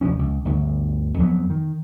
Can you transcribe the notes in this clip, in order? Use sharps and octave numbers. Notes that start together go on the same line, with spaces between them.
F1 D#2 F3 C#4
C#2
G1 D2
F2 F3 F#3 B3
D#3